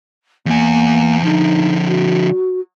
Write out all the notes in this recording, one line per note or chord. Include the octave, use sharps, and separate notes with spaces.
E2 A#3 G#5
D3 F3 D#4
F#4